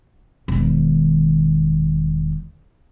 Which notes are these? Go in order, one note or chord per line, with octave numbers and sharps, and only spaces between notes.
E1 D#3